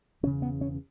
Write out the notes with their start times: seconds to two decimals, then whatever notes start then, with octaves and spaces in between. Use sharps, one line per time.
0.23 E1 E2 C#3 C#4
0.42 B3
0.61 C#4